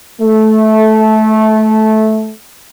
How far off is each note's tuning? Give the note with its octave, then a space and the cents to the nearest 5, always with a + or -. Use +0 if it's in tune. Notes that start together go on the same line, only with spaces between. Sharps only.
A3 -15